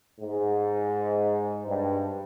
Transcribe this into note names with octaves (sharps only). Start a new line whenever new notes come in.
G#2
G2